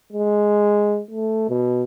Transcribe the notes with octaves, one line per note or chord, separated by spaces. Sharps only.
G#3
A3
B2